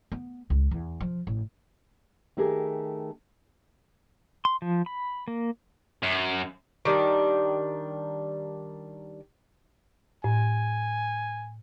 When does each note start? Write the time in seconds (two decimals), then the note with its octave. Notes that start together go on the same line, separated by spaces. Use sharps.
0.12 B3
0.50 C#2
0.71 E2
1.00 F3
1.27 A1
2.37 D#3 A3 G4 G#4 A#4
4.45 C6
4.62 F3
4.86 B5
5.28 A#3
6.03 F#2
6.85 D#3 G3 D4
10.24 A2 G#5